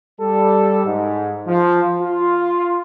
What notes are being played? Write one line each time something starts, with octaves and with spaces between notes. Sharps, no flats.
G3 A4
G#2
F3
F4